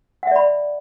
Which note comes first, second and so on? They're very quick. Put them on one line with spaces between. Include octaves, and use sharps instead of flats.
F#5 E5 D5 B5